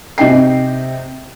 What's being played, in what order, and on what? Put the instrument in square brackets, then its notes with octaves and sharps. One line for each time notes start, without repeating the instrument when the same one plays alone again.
[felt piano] C3 D#4 G5 C7